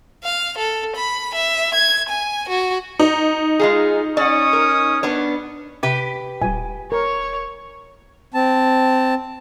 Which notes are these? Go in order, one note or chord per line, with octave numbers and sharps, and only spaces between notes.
F5
A4
B5
E5
G#6
G#5
F#4
D#4
G#3 F4 G#4
C#4 D5 F#5 C#6 D#6
A#4
B3 D4 C#5
C3 G4 B4
D#1 G#5
A#4 C#5
C4 A5